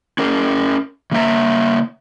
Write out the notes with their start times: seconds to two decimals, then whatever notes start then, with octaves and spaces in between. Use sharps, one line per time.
0.18 C#4 G#4 A#4
1.11 C#3 A#3 E5 A#5